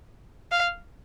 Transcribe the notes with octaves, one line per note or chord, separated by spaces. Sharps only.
F5